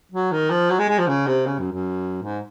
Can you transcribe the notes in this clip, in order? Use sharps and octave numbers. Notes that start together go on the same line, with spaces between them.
F#3
D#3
F3
F#3
G#3
G#3
F3
C#3
C3
C#3
F#2
F#2
G#2